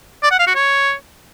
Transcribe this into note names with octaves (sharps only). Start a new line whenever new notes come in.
D5
F#5
F5
F#4
C#5